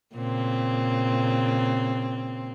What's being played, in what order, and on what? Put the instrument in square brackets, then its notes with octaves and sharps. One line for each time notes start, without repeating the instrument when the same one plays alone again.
[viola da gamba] A#2 C#3 C4